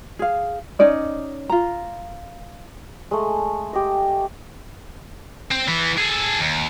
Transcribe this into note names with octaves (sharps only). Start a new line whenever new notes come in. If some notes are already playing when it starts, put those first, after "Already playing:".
G#4 F5
C#4 D#4 D5 D#5
F4 A#5
G#3 A3
G4 D#5
C4
E3 B3
G#4 A4
D#2